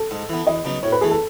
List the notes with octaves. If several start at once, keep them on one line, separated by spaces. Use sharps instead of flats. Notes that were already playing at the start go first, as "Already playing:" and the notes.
Already playing: A4
G#2
E3 B3
E2 D#5
C#3 F#3 B3 D#4
A2 C#5
B4
E3 A3 G#4
A4